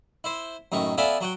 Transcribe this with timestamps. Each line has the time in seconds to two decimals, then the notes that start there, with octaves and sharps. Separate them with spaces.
0.24 E4 C5
0.72 F#2 A2 D#3 C#6
0.98 B3 F4 A4 D5 E5 G#5
1.21 F#3 F#4 G5